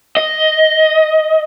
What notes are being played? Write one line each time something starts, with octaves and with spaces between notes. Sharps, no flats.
D#5